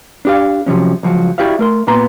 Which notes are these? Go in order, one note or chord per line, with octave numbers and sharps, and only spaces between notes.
D4 G4 F5
C3 F3 F#3 C#4
C#2 F3 F#3
E4 F#4 G4 D5 E5 F5
A3 A#4 C6
A#2 A#3 B3 A#5 C6